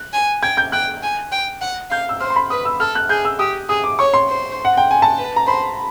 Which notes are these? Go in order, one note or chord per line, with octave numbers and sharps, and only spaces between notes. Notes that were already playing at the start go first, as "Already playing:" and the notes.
Already playing: F#6
G#5
G5 G#6
G6
G5 F#6
G#5
G5
F#5
F5 G6
E6
C5 F6
C6
B5
B4 D#6
E6
A4 F6
F#6
G#4 G6
E6
G4 D#6
G#4 D#6
D6
C#5 C#6
C6
C5
F#5
G5
G#5
A5
B4
A#5
C5 B5